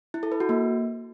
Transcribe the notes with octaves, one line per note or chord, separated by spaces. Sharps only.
E4
A4
B4
F#4
A#3